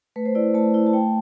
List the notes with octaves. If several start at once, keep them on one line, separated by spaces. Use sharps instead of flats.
A3 B4
C5
E4 D5
A3 A5
E4
A5
A3 G5